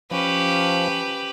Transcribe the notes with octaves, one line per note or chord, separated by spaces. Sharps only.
F3 C#4 G4 B4